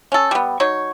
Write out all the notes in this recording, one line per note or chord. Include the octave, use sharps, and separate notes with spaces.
C#4 A4
G3 B3
F#3 D#4 C#5